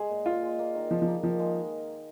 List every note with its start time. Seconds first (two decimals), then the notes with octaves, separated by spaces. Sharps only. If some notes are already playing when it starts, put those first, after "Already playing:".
Already playing: G#3 G#4
0.10 A#2
0.26 A#2 F4
0.42 G#3
0.59 A#3
0.75 D#3
0.91 F3 D#4
1.02 F3
1.08 A#3
1.23 D#3 F3
1.40 G#3